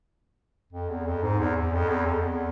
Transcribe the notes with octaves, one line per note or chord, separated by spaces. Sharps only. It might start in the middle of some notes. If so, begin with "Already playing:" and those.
F2
E2
F2
G#2
E2
E2
F2
E2
F2
E2